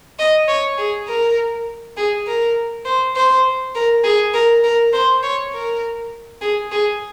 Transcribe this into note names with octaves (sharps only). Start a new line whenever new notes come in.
D#5
C#5
G#4
A#4
G#4
A#4
C5
C5
A#4
G#4
A#4
A#4
C5
C#5
A#4
G#4
G#4